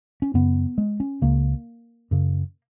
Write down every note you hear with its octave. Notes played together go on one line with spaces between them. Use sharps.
C#4
F#2 C#3 B3
G#3
C#4
C#2 C#3 A#3
F#2 C#3